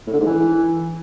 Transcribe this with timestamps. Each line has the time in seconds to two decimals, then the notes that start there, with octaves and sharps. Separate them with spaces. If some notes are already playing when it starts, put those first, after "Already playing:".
0.07 A2
0.13 D3
0.19 G#2
0.26 E3